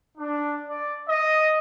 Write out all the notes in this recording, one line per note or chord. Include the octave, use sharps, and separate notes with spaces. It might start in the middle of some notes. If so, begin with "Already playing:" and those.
D4
D5
D#5